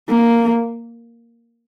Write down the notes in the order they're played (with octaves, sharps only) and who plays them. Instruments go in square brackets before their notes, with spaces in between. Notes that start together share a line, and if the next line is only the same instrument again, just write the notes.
[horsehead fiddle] A#3